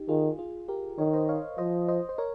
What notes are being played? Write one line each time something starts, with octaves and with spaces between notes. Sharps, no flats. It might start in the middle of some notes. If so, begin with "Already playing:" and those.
Already playing: D#4 G4
D#3 F4 G#4
F4 G#4
G4 A#4
D#3 A#4 C#5
C5 D#5
C#5 F5
F3 C5 D#5
C5 D#5
C5
A#4 C#5